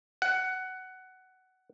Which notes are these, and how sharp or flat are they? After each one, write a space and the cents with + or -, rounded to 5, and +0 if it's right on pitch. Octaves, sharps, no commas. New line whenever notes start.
F#5 +15